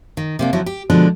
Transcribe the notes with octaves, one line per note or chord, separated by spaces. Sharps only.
D#3
C3 A#3 D4
D2 D3 F3 F#3 E4
G4
B2 D3 F3 G#3 D4